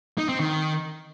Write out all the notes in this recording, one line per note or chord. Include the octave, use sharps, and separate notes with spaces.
D#4
C4
D#3